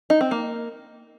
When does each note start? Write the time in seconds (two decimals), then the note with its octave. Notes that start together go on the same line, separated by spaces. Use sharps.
0.10 D#4
0.21 C4
0.31 A#3